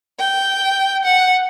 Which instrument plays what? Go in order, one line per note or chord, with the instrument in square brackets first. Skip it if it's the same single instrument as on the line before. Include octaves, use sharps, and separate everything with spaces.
[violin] G5
F#5